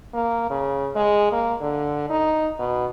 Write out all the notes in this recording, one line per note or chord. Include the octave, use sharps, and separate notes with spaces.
A#3
C#3
G#3
A#3
D3
D#4
B2